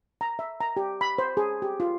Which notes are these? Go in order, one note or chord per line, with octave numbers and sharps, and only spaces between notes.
A#5
E5
A#5
G4
B5
C5
G#4
G4
F4